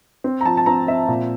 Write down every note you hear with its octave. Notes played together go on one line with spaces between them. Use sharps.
C4
A#5
F3 A5
A5
C4 A#5
C4 E5
A#2